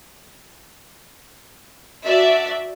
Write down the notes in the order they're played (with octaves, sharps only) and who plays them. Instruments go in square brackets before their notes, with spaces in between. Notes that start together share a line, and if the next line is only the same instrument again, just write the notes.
[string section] D4 F#4 D5 E5